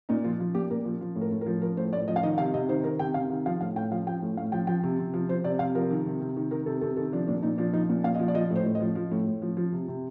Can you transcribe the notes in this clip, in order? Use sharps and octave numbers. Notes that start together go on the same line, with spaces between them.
A#2 D#4
F3 F4
F3
A#2 G4
A#2 A#4
F3
F3
A2
A#4
A2
A#4
F3
F3 A#4
A2 C5
A2 D5
F3 D#5
F5
D#3 D#5
C3 F5
C3 D#5
D#3 C5
D#3 A#4
C3 G5
C3 F5
D#3
F3 F5
A2 F5
A2 G5
F3 F5
F3 G5
A2
A2 F5
F3 G5
F3 G5
C3
C3
F3
F3 C5
C3 D5
C3 F5
F3 A#4
D#3
C3
C3
D#3
D#3 A#4
C3 A4
C3 A4
D#3 A4
F3 D4
A#2 D4
A#2 D#4
F3 D4
F3 D#4
A#2
A#2 F5
D#5
F3
D5
F3 D#5
A2
C5
A2
D#5
F3
F3
A2
A2
F3
F3
C3
C3